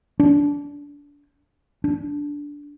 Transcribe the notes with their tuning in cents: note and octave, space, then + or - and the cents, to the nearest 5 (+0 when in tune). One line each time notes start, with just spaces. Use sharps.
D4 -25
D4 -10